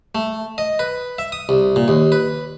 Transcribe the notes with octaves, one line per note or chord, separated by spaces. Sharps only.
A3
D#5
B4
E5
D#6
C2
A#2
D#2
B4